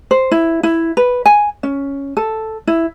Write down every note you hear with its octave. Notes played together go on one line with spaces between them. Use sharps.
C5
E4
E4
B4
G#5
C#4
A4
E4